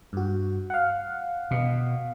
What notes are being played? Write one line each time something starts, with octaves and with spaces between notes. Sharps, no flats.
G2 F#4
F5 F#5
B2